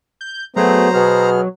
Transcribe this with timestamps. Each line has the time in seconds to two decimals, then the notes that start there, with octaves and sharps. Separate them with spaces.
0.21 G6
0.56 F#3 A3 B3 G#4 C5 A#5
0.94 B2 B3 G#4 F6